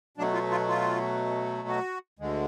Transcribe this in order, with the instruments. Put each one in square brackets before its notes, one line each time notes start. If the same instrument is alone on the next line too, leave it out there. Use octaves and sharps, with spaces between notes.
[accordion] B2 F#3 A3 D4
F4
F4
F4
F#4
D2 D3 G#3